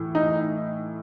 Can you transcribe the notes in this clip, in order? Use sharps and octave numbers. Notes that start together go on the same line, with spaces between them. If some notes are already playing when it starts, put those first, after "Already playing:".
Already playing: A2 E3
D#4